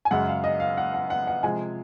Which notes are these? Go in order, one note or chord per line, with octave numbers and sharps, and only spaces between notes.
G#5
F#2 C#3 G#3 F#5
F5
D#5
F5
F#5
F#5
F#5
F#5
C3 F3 G#3 G#5